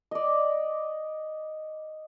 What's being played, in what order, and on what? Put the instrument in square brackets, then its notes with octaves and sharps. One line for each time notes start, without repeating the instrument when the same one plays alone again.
[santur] D5 D#5